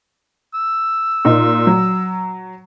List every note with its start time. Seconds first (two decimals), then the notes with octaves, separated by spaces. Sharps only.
0.54 E6
1.25 A#2 D#4
1.67 F#3